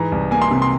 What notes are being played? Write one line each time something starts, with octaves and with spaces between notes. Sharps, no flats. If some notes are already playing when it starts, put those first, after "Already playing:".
Already playing: G#2 E3 A#5
C2
A#3 G#5
C6
C3
C6